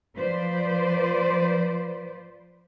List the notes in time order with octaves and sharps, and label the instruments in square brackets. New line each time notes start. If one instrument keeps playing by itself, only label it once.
[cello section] F3 B4 C5 D5